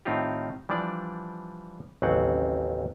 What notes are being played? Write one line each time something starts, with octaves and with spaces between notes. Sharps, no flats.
A2 D#3 C4 D#4 F4 G4
E3 F3 G3 D4 D5
A1 D#2 C#3 F#3 C4 F#5